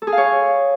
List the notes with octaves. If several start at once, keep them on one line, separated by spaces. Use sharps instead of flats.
A4
G#4
F5
C#5